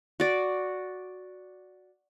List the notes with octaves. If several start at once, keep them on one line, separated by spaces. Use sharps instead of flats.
F#4 D5